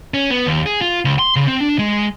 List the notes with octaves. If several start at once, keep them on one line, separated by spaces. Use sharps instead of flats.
C#4
B3
D#2
G#4
F4
C#2
C6
C#3
C4
D4
G#3